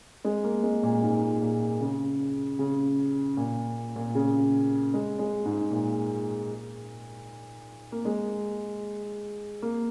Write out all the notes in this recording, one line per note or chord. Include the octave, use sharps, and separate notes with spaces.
G#3
A#3
G#3
A#2
G#2
A#2
C#3
C#3
A#2
A#2
C#3
G#3
G#3
G#2
A#2
A#3
G#3
A#3